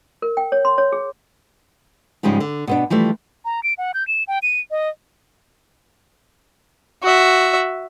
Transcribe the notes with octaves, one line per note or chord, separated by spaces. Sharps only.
A#4
G5
C#5
C6
C#5
G#4
G#2 C#3 F3 G3 G#3
D3
B2 B3 D4
E3 F3 G3 A3
A#5
D7
F#5
G6
E7
G5
D#7
D#5
F#4 E5